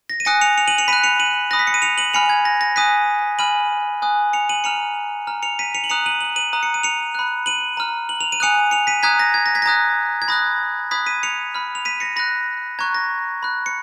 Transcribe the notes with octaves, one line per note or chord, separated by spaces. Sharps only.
A#6
D#7
G#5 D#6 F#6 A#6 C#7
C#7 F7
C#7 F7
D#7 F#7
C#7 F7
B5 F#6 B6 D#7
C#7 F7
D#7 F#7
B5 D#6 F#6 A#6
B6
C#7
D#7
C#7 F7
D#7 F#7
G#5 B5 F6 C#7 F7
G#6
A#6
A#6
G#5 D#6 F#6 B6 D#7
G#5 B5 F6 D#7 F#7
G#5 D#6 F#6
C#7 F7
D#7 F#7
A#5 F6 C#7 F7
A#5 F6
C#7 F7
B6 D#7
C#7 F7
F#7
A#5 D#6 F#6 C#7 F7
D#7 F#7
F#7
D#7 F#7
A#5 D#6 F#6
C#7
D#7
C#7 F7
B5 F#6
D#7 F#7
A#5 F6
F#7
F7
D#7
G#5 D#6 F#6 C#7 F7
C#7 F7
B6 D#7
A#5 D#6 F#6 G#6 B6
A#6
G#6
A#6
G#6 B6
A#6
A#5 D#6 F#6 G#6
G#6
B5 D#6 F#6 A#6
B5 D#6 F#6 G#6 B6
B6 D#7
C#7 F7
B5 F6
F7
B6 D#7
A#6 C#7
B5 F#6 A#6
A#5 C#6 F#6 G#6
A#6
B5 F#6
C#7